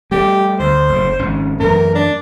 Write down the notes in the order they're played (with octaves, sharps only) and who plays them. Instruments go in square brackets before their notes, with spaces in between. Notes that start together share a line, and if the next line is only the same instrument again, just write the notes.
[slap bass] G3 A3 [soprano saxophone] G4
[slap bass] D2 [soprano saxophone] C5
[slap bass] F#1 A2
G#1 C#4
[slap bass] F#2 E3 A3 [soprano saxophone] A#4
[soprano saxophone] D4